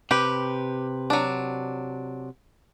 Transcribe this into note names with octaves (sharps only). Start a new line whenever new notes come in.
C3 G4 B4
F#3 D4